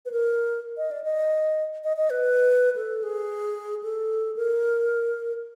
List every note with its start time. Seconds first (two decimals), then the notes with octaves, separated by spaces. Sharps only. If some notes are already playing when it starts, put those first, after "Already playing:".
0.05 B4
0.11 A#4
0.77 D#5
0.91 D5
1.04 D#5
1.84 D#5
1.97 D#5
2.10 B4
2.76 A4
3.03 G#4
3.83 A4
4.36 A#4